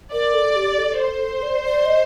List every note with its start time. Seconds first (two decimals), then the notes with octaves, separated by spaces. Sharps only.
0.13 A#4 D5
0.34 A4
0.56 G4
0.78 A4
0.99 C5
1.42 D5
1.64 D5
1.86 D#5